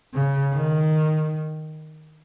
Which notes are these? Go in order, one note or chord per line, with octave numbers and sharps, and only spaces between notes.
C#3
D#3